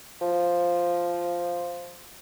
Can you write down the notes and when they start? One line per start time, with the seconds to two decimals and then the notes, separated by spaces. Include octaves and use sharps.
0.22 F3